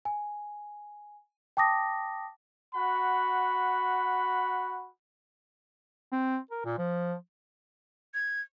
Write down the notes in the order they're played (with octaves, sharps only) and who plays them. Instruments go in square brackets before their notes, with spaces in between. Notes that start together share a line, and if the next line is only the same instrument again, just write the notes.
[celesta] G#5
G5 A5 D6 D#6 A#6
[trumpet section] F#4 F#5 B5
[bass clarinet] C4
A#4
A#2
F3
[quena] G#6